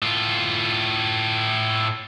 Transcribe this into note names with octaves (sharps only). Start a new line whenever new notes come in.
A2 F4